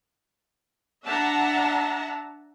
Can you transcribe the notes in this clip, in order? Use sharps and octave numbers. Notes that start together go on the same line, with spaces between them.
D4 E5 F#5 A5 A#5